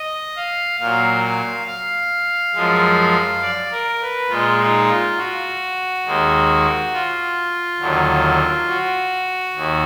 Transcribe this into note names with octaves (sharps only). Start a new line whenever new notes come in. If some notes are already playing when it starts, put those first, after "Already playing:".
Already playing: D#5
F5
A#2 F#3 F5
F5
F5
F#2 F3 G#3
D5
A#4
B4
A#2 G#3 F4
D#4
F4
F#4
D#2 D#3 G#3
F4
D#2 D3 F#3
F#4
D#2